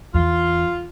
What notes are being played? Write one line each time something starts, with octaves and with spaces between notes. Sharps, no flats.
E2 F4